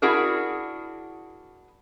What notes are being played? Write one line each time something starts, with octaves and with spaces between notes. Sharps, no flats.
D4 E4 F#4 G#4 A#4